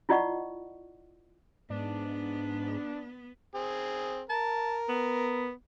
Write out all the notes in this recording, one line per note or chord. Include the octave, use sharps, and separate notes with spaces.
E4 F4 D5 D#5 F#5 C#6
G#2 B3 D4
C4 G#4
A#4 A5
B3